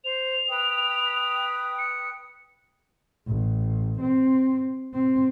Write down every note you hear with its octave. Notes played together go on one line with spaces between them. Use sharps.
C5 F7
B4 G5 D#6
C#7
A1
C4
C4